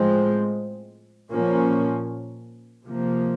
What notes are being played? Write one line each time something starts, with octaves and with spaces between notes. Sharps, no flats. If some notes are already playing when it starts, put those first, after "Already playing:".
Already playing: A2 F3 G#3 C4
A#2 F3 A#3 C#4
C3 F3 A#3